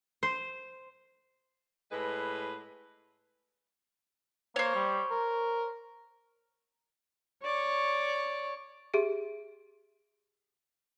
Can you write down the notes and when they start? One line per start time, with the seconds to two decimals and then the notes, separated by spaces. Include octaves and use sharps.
0.23 C5
1.91 A2 G#3 B4
4.56 A#3 C5 C#5
4.75 G3
5.10 A#4
7.44 C#5 D5 C#6
8.94 G4 G#4 E5 D7